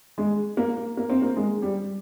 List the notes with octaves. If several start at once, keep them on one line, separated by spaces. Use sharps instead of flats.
G#3
A#3
A#3
C4
A#3
G#3
G3